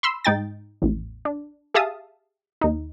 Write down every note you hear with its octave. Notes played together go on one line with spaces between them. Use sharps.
B5 C6 E6
G#2 D#4 G5 A6
A1 E2
D4
G4 G#4 E5 F5 A5 D#6
D#2 D#4